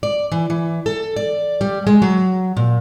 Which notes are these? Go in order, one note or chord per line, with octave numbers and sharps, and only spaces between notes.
D5
E3
E3
A4
D5
G3
G#3
F#3
A#2